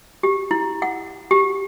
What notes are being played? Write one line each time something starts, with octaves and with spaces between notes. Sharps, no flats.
G4
E4
F#5
G4